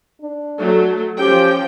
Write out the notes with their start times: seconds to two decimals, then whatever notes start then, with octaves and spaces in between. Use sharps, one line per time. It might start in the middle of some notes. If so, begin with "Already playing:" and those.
0.22 D4
0.59 F#3 A3
1.18 F3 C#4 G4 G5